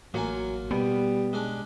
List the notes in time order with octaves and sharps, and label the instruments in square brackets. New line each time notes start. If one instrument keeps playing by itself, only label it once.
[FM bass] A1 [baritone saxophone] F#3 [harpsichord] A#3 F4 G#5
[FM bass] B2 [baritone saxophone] G3 [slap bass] B3
[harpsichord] G#3 C#4 D4